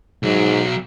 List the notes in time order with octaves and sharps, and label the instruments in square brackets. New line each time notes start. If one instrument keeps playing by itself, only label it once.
[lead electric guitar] B1 F#3 [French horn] G#2